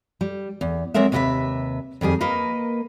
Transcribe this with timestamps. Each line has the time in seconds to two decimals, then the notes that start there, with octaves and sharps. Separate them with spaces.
0.21 G3
0.61 E2
0.94 F#3 G#3 C4 A#4 E5
1.12 D#2 C3 D#4 F#4 B4 E5
2.01 F2 D#3 G3 G#4
2.21 A#3 A#4 B4 D#5